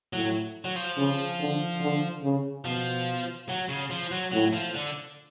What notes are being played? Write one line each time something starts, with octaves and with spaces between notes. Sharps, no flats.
A2 F#3
F#3
F3
C#3
D3
D3
C#3
B2 F3
F#3
C#3
F3
F#3
A2 F#3
F3
D3